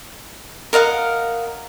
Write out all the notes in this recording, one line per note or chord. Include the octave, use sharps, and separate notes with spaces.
A#4 D#5 F5 F#5